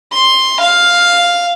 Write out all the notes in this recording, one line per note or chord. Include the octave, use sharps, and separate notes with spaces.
C6
F5